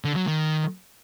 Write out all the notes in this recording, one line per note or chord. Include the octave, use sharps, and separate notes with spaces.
D3
F#3
D#3